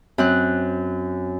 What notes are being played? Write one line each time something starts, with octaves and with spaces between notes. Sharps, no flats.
F#2 C4 F#6